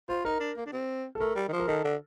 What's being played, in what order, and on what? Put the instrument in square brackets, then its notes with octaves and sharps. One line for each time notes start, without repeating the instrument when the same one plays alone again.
[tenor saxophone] F4 [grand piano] C5
[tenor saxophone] D#4 [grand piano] A#4
[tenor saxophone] D4
A#3
D4
C4
[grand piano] A4
[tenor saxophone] A3 [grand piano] A#4
[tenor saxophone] G3
D#3
F3
[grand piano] A#4
[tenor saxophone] D#3 [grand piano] A4
[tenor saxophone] D3